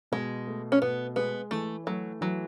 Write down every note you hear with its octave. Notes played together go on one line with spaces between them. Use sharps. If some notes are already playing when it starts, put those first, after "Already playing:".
B2 G#3
A3
C#4
B2 B3
G#3 B3
E3 A3
F#3 A3
E3 F#3